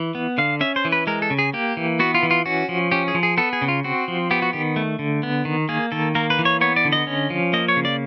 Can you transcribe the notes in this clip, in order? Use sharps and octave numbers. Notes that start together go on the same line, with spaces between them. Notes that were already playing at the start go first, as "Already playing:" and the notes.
Already playing: E3
B3
D3 F5
C#4 E5
C5
E3
B4
G#3 A#4
A4
C#3
G#4
A#3 G4
E3
B3 F#4
F4
E3
F4
C#4 F#4
F3
C#4 G4
G#4
F3
G#4
B3 A4
G#4
C#3
F4
C4 F#4
F3
B3 G4
F#4
D#3 G4
A3
D3
B3
D#3
A#3 G#4
D#3 A4
A#3 A#4
B4
E3
C#5
B3 C#5
D5
D3
D#5
C#4
F3
A#3 D#5
C#5
C#3
D5